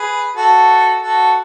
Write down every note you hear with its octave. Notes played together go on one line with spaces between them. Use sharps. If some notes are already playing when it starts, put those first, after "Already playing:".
Already playing: G#4 B4
F#4 A4
F#4 A4